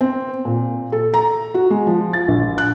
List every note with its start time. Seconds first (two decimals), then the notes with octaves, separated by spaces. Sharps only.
0.01 C4
0.45 A#2
0.92 A4
1.14 A#5
1.54 F#4
1.70 G#3
1.87 F3
2.13 A6
2.28 A#1
2.58 F#6